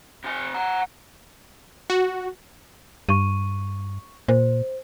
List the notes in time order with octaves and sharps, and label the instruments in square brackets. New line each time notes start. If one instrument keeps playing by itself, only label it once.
[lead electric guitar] C3 G#5
F#5 A#5
[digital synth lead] F#4
[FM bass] G2 [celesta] C#6 D#7
[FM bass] A#2 [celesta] C5